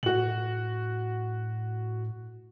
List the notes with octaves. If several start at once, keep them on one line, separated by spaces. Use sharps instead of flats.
A2 F#4 F#7